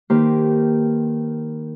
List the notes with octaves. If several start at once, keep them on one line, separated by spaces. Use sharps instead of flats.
D#3 A#3 G4 B4 C5